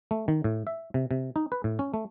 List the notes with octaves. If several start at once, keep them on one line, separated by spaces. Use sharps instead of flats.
A3
D#3
A2
E5
C3
C3
D#4
B4
A2
C#4
A3